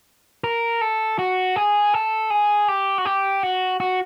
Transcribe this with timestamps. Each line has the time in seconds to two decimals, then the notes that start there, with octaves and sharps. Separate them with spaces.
0.44 A#4
0.81 A4
1.19 F#4
1.56 G#4
1.94 A4
2.30 G#4
2.68 G4
2.98 F#4
3.05 G4
3.43 F#4
3.80 F#4